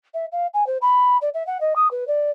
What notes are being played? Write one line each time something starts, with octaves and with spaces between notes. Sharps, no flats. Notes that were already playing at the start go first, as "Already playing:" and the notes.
E5
F5
G#5
C5
B5
D5
E5
F#5
D#5
D#6
B4
D5